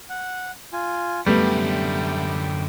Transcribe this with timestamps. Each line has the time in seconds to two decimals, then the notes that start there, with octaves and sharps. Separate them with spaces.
0.10 F#5
0.73 F4 G#5
1.26 F#2 D3 G3 A3 B3 G5